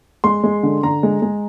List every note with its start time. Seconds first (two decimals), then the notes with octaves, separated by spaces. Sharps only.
0.24 G#3 C6
0.44 G#3
0.63 D3
0.83 D3 A#5
1.03 G#3
1.22 G#3